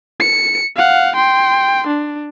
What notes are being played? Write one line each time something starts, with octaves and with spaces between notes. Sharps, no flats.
C#7
F5 F#5
G5 C6
D4